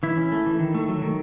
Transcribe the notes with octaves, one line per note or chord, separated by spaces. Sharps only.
E3 E4
C#4
A3
E3
D#3
A3
F#3
D#3